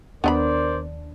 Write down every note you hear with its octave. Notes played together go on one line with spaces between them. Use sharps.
D#2 B3 D4 A#4 C5 D5 D#5 B5